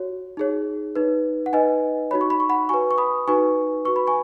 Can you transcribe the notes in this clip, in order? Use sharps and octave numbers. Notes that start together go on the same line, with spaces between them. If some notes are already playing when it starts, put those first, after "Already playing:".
Already playing: F#4 C#5
D#4 G#4 C#5
D#4 B4
F#5
D#4 B4 D#5 G#5
D#4 F#4 C#5 B5
C#6
B5
C#6
F#5 B5
F#4 B4 G#5 C#6
C#6
B5 D#6
D#4 F#4 B4 G#5 C#6
F#4 B4 C#6
B5
G#5 C#6